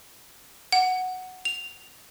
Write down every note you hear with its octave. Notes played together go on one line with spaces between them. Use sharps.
F#5
F7